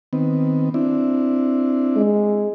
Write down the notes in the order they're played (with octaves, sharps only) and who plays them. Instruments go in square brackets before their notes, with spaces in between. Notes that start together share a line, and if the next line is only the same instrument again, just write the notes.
[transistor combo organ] D#3 B3 C4
C4 D4 E4
[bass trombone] G#3